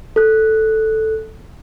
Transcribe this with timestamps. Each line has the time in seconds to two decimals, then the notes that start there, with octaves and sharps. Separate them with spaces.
0.16 A4 F#6